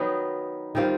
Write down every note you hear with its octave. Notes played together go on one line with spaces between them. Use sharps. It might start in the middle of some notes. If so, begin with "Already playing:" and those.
Already playing: D#3 F#3 B3 D#4
D#3 G3 C4 F4